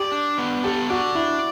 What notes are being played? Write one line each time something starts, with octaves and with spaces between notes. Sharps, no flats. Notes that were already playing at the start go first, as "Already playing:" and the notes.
Already playing: G4 D5
D4
B3
G4 A4
F#4 D5
D4 E4